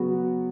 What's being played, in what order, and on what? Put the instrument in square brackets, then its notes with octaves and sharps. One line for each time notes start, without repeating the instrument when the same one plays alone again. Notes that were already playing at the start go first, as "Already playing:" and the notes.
Already playing: [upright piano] C#3 F#3 B3 F#4